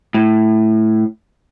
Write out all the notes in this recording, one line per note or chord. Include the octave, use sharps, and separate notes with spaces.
A2